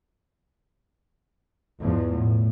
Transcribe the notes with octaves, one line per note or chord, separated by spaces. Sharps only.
E2 G#2 B2 F3
A2